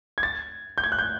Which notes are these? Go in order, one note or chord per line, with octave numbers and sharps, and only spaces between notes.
G#6
A6
G6
G#6
F#6
G6